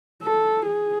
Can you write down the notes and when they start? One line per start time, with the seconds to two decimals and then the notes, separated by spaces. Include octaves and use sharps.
0.23 A4
0.68 G#4